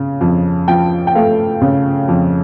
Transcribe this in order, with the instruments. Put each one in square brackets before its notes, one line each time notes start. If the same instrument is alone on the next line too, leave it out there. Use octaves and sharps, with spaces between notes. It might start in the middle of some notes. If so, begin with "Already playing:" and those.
Already playing: [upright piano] C#3
F2
F3 G5
G5
A3 F5
C#3
F2